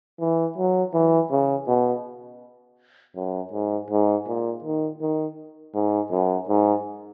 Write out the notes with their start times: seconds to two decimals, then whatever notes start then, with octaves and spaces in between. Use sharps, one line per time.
0.20 E3
0.58 F#3
0.93 E3
1.30 C#3
1.67 B2
3.15 F#2
3.53 G#2
3.90 G#2
4.27 A#2
4.64 D#3
5.01 D#3
5.74 G#2
6.11 F#2
6.48 G#2